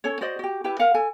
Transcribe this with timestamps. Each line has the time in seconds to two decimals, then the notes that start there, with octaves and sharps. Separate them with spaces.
0.04 C#4 A4 C#5
0.21 F#4 C5 D5 D#5
0.39 F#4 G4
0.64 E4 G4 B4 E5
0.79 A#4 F5 F#5
0.94 A4 G#5